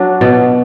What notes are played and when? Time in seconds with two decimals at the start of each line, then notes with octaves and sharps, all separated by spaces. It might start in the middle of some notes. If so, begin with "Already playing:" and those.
Already playing: F#3 D4 F#4
0.21 B2